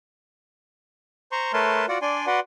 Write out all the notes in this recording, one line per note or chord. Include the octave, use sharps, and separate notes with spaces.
C5 A#5 C6 C#6
A3 A#4 B4 C#5 A5 C6
F4 F#4 D5 F#5
D4 D5 G#5 C6
F#4 B4 D5 F#5 C6